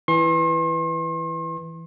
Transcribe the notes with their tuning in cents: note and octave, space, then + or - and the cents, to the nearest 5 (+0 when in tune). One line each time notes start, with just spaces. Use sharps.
E3 +0 C6 +40